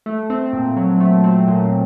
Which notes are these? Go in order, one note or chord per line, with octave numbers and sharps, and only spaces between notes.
A3
C4
A#2
F#3
A3
C4
A#2